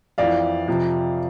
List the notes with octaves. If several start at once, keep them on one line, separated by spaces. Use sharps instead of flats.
F2 E3 D5 F5
F2 C3 F3